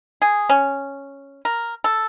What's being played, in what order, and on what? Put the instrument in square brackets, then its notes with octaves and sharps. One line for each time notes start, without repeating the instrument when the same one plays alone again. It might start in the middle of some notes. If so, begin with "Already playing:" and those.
[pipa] G#4
C#4
A#4
A4